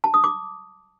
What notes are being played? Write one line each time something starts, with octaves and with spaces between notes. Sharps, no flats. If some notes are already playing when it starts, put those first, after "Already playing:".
A5
D#6
D6